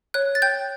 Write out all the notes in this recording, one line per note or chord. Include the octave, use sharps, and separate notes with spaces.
C#5 F#6
A6
G5 G6